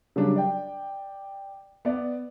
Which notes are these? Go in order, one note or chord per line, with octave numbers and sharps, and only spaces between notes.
C#3 F#3 G3 D4
D5 G5
B3 D5